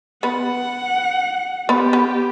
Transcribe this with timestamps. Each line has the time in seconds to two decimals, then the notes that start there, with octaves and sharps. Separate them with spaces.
0.23 B3 B4 F#5
1.69 B3 G4 B4
1.93 B3 B4